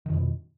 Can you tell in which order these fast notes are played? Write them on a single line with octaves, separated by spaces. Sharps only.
D#3 F2 B2